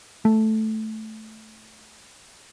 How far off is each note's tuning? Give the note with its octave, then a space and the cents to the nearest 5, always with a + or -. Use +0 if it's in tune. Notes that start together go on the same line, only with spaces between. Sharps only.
A3 -5